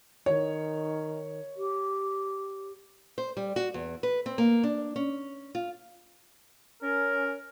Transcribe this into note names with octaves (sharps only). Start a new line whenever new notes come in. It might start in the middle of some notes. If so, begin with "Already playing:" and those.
D#3 C#5
G4
C5
G3
F#4
E2
B4
C4
A#3
D4
C#4
F4
C#4 A#4